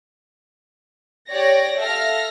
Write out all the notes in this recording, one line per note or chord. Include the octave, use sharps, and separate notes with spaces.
G4 C#5 D5 A#6
A4 E5 F5 F6 A#6